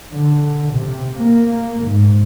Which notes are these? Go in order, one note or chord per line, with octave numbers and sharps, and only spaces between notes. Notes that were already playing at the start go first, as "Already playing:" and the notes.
D3
C3
A#3
G#2